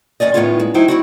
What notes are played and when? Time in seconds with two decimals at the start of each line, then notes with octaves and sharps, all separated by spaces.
0.20 D#2 F#3 C#4 D5 D#5
0.34 A2 D#3 F3 B3 C#4 F4
0.60 G#3
0.74 D2 F#3 D#4 E4 C5 G5
0.88 C4 E4 F#4